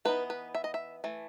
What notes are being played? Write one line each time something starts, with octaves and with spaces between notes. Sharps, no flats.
E3 B3 D#4 B4
B4
E5
D#5
E5
E3 A3